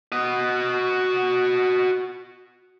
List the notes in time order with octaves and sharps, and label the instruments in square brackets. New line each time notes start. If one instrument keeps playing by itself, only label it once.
[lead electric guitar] F#4 D#5